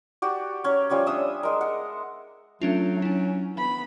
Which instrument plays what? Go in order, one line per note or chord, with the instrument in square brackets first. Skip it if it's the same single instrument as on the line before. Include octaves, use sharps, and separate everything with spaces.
[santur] F#4 G4 D5
C#4 C#5 A#5
F3 G3 C#4 G#5
D4 E5 D#6 E6
G#3 A#4
F#5
[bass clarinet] F#3 [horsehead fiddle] A3 [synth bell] C#4 D4 F4
[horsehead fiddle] C#4 [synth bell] D4 E4
[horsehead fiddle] B3 B5